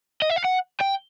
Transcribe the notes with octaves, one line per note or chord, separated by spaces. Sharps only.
D#5
E5
F5
F#5
G5